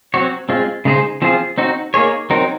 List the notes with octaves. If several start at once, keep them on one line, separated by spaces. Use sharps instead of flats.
F#3 C4 F#4 C#5
G#3 C4 F4
C#3 G#3 D#4 G#4 C5
F3 C4 F4 G#4
C4 D#4 F#4
A#3 D#4 G#4 C#5
F#3 C4 D#4 A#4